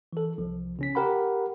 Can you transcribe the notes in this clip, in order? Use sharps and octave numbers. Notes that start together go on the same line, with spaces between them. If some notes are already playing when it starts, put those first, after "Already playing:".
E3 A4
C2 F3
C#3 C#4 B6
G4 A#4 F#5 G5 B5